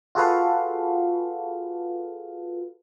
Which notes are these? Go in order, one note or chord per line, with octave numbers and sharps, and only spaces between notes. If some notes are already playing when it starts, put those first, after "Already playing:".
F4 F#4 G#4 A4 B4 F5